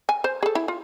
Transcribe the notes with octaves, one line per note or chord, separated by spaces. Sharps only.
G#5
C5
G#4 A4
E4
F4